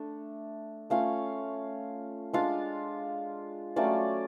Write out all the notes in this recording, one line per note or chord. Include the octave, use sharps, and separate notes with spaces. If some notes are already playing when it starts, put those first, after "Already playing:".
Already playing: A3 D4
A3 C#4 F4 F5
G#3 D4 F4 F5
F#3 A3 C#4 F4 D5